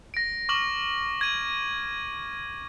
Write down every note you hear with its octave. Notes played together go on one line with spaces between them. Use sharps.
A#6 D7
C#6 D6 F6 F#7
G#6 D#7